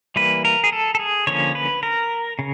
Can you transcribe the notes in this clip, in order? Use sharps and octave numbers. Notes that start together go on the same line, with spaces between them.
E3 G3 A#3 B4
A#4
G#4
A4
A4
G#4
D3 F3 A#3 C#4 C#5
B4
A#4
C#3